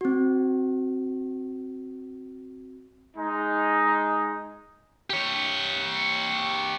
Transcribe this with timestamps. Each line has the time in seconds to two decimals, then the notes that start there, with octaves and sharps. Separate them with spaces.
0.01 C4 F#4
3.17 G#3 D#4
5.10 G4 C#5